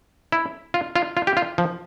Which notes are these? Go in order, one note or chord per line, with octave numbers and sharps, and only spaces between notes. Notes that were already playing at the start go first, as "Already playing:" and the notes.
E4
F4
F4
F4
G4
F4
F3